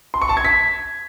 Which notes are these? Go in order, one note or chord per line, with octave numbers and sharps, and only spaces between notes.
C6
C#6
A5
G#6
B6